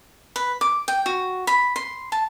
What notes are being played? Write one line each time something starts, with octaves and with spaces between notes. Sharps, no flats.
B4
D6
G5
F#4
B5
C6
A5